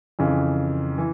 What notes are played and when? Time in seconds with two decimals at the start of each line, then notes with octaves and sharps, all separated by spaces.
0.19 F2 C#3 E3
0.98 E3